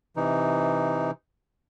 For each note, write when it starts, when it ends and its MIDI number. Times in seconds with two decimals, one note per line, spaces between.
0.16 1.11 48
0.16 1.11 52
0.16 1.11 63